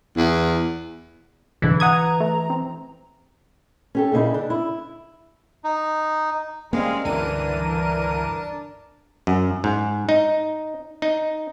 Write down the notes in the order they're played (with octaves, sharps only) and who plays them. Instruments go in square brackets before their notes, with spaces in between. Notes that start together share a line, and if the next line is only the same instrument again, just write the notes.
[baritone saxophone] E2
[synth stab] C2 G#2 D3 [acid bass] E3
[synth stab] F#5 D#6 G#6 [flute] A#5
[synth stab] A3
C4
[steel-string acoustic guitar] C#4 G4 A4
A#2 C#3 D#4 E4
D4
E4
[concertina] D#4
[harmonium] G3 C4 [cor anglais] G#3 [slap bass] A#3 C#4 [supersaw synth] F5
[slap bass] C#2 G2 [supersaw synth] D3 E3 D#7 [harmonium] D4 A5 [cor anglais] A#4
[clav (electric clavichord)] F#2
G#2
D#4
D#4